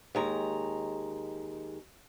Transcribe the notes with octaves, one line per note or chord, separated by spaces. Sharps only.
D#2 G#3 A#5